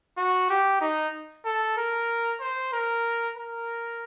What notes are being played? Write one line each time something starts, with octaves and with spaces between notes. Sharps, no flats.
F#4
G4
D#4
A4
A#4
C5
A#4
A#4